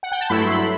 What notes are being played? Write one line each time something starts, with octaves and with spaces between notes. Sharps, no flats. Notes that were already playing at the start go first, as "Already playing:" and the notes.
F#5
G5
A5
G2 F#3 A3 E4 B5
C6
B5